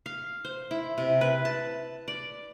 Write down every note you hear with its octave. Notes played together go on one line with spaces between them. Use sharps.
F5
C5
E4
C3
B4
A5
D5